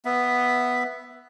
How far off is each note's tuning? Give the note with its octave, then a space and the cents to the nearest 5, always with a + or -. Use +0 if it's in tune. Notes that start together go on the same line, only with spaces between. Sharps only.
B3 +0 E5 +0